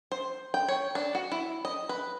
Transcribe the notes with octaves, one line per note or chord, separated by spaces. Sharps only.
C5
G5
C#5
D4
F#4
E4
D#5
B4